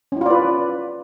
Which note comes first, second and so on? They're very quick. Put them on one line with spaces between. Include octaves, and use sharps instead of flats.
C#4 E4 F4 D5 B4